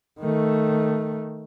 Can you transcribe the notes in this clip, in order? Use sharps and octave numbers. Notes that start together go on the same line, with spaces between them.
D#3 A3